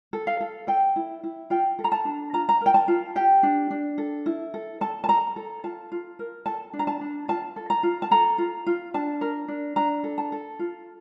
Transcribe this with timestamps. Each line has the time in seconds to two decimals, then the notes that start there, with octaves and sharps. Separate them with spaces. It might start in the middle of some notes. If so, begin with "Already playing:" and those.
0.13 A4
0.27 F5
0.41 A4
0.67 A4 G5
0.96 E4
1.23 E4
1.50 F4 G5
1.79 A4
1.84 A#5
1.92 A5
2.05 D4
2.33 F4 A#5
2.49 A#5
2.61 A#4 G5
2.74 A5
2.88 F4
3.16 G4 G5
3.43 D4
3.70 D4
3.98 A4
4.26 E4
4.54 A4
4.81 A4 A5
5.04 A5
5.08 A4 A#5
5.36 A4
5.64 F4 A5
5.92 F4
6.19 A#4
6.46 A4 A5
6.73 D4
6.79 A#5
6.87 A5
7.01 D4
7.28 F4 A5
7.56 A4
7.70 A#5
7.83 F4
8.02 A5
8.11 A4 A#5
8.38 F4
8.66 F4
8.94 D4 A5
9.21 A#4
9.48 D4
9.76 D4 A#5
10.03 A4
10.18 A5
10.32 A4
10.59 F4